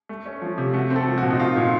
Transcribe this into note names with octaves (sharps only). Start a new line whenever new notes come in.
A3
C#4
F3
C3
A3 F#4
C4
A4
F3
F#4
A#2
D#4
A3 F4
A#2